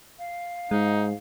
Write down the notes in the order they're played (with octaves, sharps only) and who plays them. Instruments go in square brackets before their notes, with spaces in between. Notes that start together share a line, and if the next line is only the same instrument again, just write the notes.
[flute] F5
[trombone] G#2 [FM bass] G#3 [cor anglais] D#4